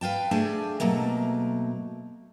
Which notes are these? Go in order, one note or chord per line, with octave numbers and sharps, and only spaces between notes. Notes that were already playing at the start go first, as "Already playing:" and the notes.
B4 F5 G5 A5
A3 D4 G4 G#4 G#5 A5
B2 F#3 A3 A#3